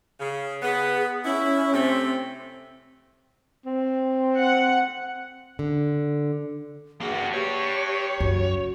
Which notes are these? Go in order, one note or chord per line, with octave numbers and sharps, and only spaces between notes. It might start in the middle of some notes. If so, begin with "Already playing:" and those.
C#3
B3 G#4
C#4 E4
C3 A3 C4
C4
F#5
D3
G2 A#3 F#4 G#4
G4 C#5
F#2 F#4